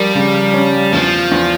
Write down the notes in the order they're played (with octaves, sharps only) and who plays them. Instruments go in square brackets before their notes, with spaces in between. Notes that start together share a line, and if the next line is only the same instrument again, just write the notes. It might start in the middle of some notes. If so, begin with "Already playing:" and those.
Already playing: [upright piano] F3 A#4 [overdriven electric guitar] G3
[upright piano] C#3
C#4
[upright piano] E2 [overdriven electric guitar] F3
[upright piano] E2